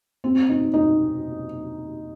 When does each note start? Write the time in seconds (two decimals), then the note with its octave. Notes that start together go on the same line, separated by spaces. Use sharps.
0.24 C4
0.49 D#4
0.74 D#4